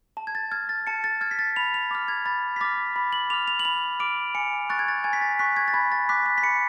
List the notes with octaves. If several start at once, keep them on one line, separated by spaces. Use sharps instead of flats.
A5
G#6
A6
F6 G#6
A6
A5 C#7
A6
F6 G#6
B6
A6
B5 F7
F7
D6 F6
G#6
B5 A6
B6
D6 F6 A6
B5
F#7
D6 F6 F7
F7
F#7
B5 F7
D6 F6 D7
G#5 C#7
C#6 F#6 A6
G#6
A6
G#5 G#6
B6
A6
C#6 F#6 B6
G#6
A6
B5 G#6
A6
D6 F#6 B6
B6
B6
B5 C#7